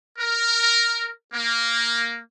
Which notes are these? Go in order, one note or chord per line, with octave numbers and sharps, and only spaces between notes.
A#4
A#3